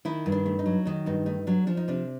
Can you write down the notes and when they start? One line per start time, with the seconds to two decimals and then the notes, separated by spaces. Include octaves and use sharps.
0.05 D#3 E4
0.26 G2
0.32 D4
0.46 A3
0.59 D#4
0.66 F#3
0.85 D#3 D#4
1.06 G2 D#4
1.26 A3 D#4
1.47 F#3 D4
1.67 F3 D4
1.77 D#4
1.88 C3 D4